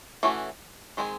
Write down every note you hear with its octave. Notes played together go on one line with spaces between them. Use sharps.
E3 A3 C#4 F#4
D#3 G#3 C4 D#4 G#4